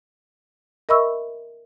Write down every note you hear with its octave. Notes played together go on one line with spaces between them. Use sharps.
A#4 D#5 E5 B5 C#6 E6